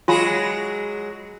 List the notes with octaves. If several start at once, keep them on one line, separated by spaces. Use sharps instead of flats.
F#3 G#3 F4 G#4 G#5 B5